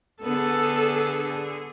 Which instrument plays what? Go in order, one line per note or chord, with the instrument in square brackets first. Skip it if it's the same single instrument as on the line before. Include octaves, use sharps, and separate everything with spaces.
[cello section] D3 G#4 [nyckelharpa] B3 [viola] A4